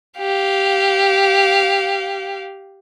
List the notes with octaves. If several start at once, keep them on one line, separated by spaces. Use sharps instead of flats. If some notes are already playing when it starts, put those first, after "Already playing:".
G4 F5